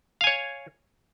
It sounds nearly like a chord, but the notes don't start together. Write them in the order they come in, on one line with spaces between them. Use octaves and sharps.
F5 G#5 C#5